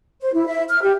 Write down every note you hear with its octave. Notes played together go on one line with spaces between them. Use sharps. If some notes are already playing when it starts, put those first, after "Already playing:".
C5
E4
E5
F6
G4